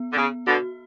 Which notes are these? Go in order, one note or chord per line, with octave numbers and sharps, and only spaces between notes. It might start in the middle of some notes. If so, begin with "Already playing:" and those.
Already playing: B3
D3
C#3 B3
B2 D3 F#4